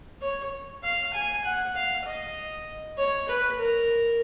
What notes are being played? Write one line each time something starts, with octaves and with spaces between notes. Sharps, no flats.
C#5
F5
G#5
F#5
F5
D#5
C#5
B4
A#4